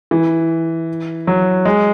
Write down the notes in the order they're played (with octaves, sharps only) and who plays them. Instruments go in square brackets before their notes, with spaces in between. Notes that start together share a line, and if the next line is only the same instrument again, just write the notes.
[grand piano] E3
F#3
G#3